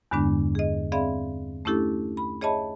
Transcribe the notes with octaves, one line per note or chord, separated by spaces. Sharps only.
E2 G2 D3 G#3 B3 D4
G#4 D#5
C4 G#4 D5 E5 F5 B5
A3 C#4 D4 E4 G4 A4
B5
G#4 C#5 D#5 E5 A5 B5